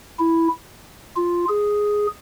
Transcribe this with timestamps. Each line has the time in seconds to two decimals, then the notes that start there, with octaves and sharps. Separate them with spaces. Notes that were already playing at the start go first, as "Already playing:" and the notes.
0.19 E4
1.16 F4
1.49 G#4